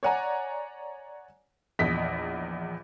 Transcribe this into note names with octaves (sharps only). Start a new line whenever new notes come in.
C#5 D5 F#5 G#5 A#5
A#1 E2 D#5 B6